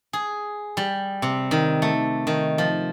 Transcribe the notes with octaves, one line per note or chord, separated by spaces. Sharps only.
G#4
G3
C3
D#3
A3
D#3
F3